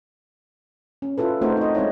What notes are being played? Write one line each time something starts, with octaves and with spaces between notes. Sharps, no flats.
C#4
E4 F4 A4 B4
A3 C4 D#4 F#4 A#4 C5
D#4 D#5
G#3 C4 D#4 E4 C#5